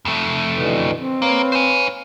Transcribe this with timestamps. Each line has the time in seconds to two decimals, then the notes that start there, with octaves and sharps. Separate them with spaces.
0.05 F2 A3
0.52 B2 D3 E3
0.94 C4
1.22 A#3 B4 C#5 F5
1.52 C5 G#5